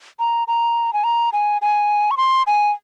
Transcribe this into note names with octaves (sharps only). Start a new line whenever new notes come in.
A#5
A#5
G#5
A#5
G#5
G#5
C#6
C6
G#5